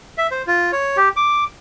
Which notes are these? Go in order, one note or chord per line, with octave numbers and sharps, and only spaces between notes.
E5
C5
F4
C#5
G4
D6